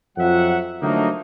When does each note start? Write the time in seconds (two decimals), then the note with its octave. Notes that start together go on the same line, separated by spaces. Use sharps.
0.18 F2 F#3 C4 F4 E5 F#5
0.82 D3 F3 F#3 A3 A#3 D#4